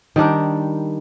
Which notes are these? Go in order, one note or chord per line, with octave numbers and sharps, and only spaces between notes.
D#3 G3 D4 A#4